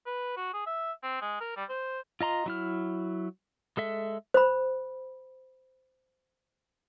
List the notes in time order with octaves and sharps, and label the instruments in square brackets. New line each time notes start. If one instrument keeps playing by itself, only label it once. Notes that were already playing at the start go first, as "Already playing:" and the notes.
[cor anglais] B4
F#4
G#4
E5
C4
G#3
A#4
G3
C5
[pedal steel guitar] F4 D#5 A#5 C6
F#3 E4 F6
G#3 A4 E5
[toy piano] C5 B5